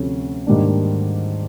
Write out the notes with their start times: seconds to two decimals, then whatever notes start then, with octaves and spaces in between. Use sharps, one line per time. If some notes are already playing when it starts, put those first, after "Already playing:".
Already playing: D2 C3 F3 A3 C#4
0.47 G#2 D#3 G3 A#3 D4